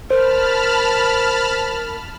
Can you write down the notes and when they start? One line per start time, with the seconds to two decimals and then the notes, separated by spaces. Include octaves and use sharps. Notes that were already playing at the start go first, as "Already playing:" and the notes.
0.10 A#4 C5 A5 B5 F6